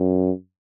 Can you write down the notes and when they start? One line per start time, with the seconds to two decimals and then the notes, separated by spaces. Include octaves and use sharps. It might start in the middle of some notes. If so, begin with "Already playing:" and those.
Already playing: F#2